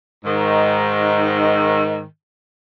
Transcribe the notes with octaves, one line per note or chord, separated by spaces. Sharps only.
G#2 D#3